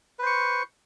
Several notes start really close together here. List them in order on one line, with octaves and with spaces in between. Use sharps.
B4 C5 C#6